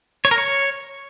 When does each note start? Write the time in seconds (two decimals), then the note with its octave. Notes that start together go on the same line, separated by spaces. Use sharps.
0.25 C#5
0.31 A#4
0.38 C#5